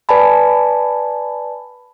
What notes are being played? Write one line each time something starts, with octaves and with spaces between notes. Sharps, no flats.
B4 D5 G#5 A5 B5